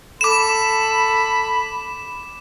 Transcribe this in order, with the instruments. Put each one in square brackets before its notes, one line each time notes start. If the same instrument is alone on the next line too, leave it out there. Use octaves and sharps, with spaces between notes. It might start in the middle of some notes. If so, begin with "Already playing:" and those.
[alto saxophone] A4 [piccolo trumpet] B5 [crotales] D6 E7